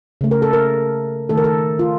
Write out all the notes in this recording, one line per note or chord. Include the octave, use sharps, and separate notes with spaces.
C#3 A3
A#4
A4
A#4
D#3 A3 A4
A#4
A4
F4